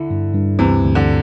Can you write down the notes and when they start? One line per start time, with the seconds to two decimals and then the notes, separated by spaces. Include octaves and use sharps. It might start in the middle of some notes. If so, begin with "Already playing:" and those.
Already playing: D3 E4
0.11 G2
0.34 G2
0.59 D2 C3 E3
0.83 D2
0.95 D3